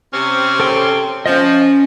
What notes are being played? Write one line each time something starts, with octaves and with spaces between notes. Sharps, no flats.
C3 C4 C#4
A4 G5 C6
F3 C#4 D#5